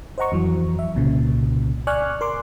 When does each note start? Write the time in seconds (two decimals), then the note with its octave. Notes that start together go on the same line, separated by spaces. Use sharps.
0.18 C5 D#5 F#5 A#5 C#6
0.32 F2 E3 F#3
0.79 E5
0.95 C2 A#2 C#3
1.87 D5 G#5 C#6 F6 F#6
2.21 A#4 C6 D6